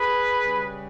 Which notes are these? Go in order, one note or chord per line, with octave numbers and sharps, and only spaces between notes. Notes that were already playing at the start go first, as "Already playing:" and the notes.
Already playing: G#4 B4
C#3 G3